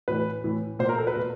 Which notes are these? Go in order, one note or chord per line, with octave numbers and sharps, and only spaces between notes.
A2 E3 B4
A2 E3
A#2 C5
A#4
A4
B4
A#2